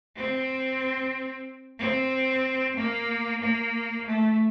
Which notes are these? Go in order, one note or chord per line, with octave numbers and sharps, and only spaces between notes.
C4
C4
A#3
A#3
A3